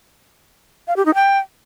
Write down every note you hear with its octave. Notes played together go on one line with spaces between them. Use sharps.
F5
G4
D#4
G5